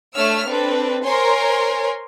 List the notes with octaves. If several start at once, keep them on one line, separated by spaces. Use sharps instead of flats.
A3 D4 C#5 E6 F6
C4 D4 A4 B4
A#4 C5 C#5 G#5 C6